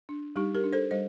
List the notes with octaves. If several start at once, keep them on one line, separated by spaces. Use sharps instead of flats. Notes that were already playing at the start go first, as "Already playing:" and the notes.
D4
G3 D#4 G4
G4 A#4
D4
A4 C5
G3 C5 D#5